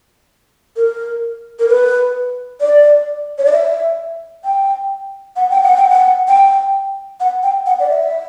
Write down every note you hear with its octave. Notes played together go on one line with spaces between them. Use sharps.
A#4
A#4
B4
D5
C#5
D5
E5
G5
F#5
G5
F#5
G5
F#5
G5
F#5
G5
F#5
D5
E5